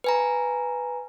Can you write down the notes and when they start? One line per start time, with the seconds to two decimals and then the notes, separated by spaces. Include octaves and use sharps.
0.04 B4 G#5 A#5